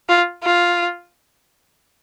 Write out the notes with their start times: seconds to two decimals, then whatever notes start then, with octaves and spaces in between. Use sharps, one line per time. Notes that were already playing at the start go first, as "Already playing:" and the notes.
0.09 F4
0.44 F4